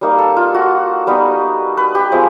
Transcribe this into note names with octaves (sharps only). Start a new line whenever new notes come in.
G3 A#3 D#4
A4
F4
F#4
G3 B3 D#4
B4
G4
F3 G#3 C4